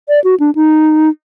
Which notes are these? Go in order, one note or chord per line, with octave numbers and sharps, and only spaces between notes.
D5
F#4
D4
D#4